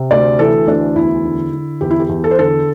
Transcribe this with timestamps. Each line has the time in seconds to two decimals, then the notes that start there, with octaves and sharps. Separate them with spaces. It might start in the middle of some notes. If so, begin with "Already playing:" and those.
Already playing: C3
0.11 D2 D5
0.39 E3 A4
0.67 D2 D4
0.96 E2 E4
1.25 D3
1.53 D3
1.81 E2 G4
1.91 E4
2.00 G4
2.09 E2
2.24 A4
2.31 C5
2.38 D3 A4